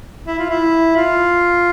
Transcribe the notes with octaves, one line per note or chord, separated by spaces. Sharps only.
E4
F4
E4
F4